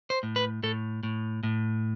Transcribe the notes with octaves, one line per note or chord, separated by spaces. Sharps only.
C5
A2
B4
A2 A4
A2
A2